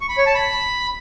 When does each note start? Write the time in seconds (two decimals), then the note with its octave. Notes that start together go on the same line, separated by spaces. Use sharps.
0.01 C#6
0.09 B5
0.18 C#5
0.26 A5
0.35 B5